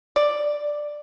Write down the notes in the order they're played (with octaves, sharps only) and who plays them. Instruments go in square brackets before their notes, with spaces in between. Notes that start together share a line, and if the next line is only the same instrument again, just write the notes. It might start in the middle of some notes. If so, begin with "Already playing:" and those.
[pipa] D5